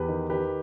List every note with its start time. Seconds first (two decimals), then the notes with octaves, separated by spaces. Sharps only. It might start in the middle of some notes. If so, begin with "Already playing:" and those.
Already playing: E2 G4 B4
0.08 D#3
0.30 D#3 G4 B4